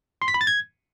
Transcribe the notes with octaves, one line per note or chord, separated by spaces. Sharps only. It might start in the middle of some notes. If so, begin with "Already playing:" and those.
C6
B6
B5
A6
G#6